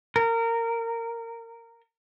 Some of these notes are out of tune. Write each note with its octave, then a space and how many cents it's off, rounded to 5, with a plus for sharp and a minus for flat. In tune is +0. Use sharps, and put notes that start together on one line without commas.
A#4 -20